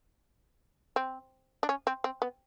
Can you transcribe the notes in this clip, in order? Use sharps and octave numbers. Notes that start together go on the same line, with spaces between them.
C4
D4
C#4
C4
C4
B3